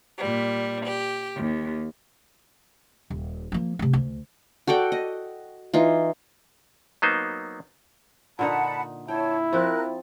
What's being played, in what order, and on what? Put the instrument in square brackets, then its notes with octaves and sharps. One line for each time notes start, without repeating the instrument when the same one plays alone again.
[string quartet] A#2 G3
G4
D#2
[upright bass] D#1
F3 A#3
C3 A3
D2
[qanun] F#4 A4 D5 G5
D#5
E3 D#4 F4
[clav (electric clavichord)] F#3 A#3 B3 D#4 C5
[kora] A#2 D3 D#4 [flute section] F#5 A5 B5
[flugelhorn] E4 [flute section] C#5 A5 [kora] G5
[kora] F3 C4 [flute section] A#4 F#6